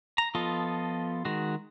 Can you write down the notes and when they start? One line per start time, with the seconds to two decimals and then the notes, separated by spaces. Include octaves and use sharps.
0.18 A#5
0.35 F3 B3 F4 A4 D#5
1.25 D#3 G#3 F#4